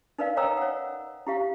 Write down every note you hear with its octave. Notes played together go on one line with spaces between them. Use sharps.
D#4 A#4 B4 D5 F5
C#5 D#5 G5 A#5 D#6 E6
C#5 F#5
E4 G4 F5